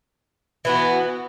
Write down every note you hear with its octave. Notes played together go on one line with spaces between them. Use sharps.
E3 B3 F#4